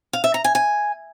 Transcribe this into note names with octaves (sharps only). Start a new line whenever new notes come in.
F5
E5
A#5
G#5
G#5